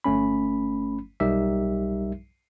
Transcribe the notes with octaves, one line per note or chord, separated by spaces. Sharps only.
G1 A3 C#4 B5
B1 G3 D#4 G4 A#4 E5